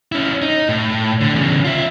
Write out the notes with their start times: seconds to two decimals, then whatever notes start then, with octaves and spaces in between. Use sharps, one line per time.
0.12 C#4 E4
0.42 D#4
0.69 A2
1.21 D3
1.33 E2 C#3
1.65 F4 E5